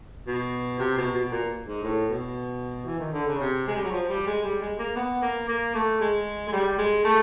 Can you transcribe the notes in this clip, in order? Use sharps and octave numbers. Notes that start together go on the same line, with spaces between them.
B2
C3
B2
B2
A#2
G#2
A2
B2
E3
D#3
D3
C#3
C3
G#3
G3
F#3
F3
G3
G#3
G3
G#3
A#3
B3
A#3
A#3
A3
G#3
G#3
G3
G#3
A3